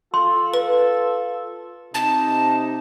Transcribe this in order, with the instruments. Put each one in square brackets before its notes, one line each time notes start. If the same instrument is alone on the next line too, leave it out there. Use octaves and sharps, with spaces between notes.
[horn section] F4 A4 [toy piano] C6
[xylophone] B4
[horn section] C3 D#4 [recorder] A5